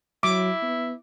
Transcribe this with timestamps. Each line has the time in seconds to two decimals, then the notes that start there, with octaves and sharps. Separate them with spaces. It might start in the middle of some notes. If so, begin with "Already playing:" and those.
0.23 F#3 E4 D6
0.62 B3